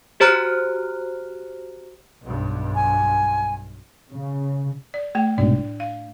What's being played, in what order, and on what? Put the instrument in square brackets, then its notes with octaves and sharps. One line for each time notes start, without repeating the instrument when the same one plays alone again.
[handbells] F#4 G4 C5 A#5 F6 F#6
[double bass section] B1 G2
[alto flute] G#5
[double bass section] C#3
[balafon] D5
A3 G5
[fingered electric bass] C2 G#2 B2 [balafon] D4 D5
[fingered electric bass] A2
[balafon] F5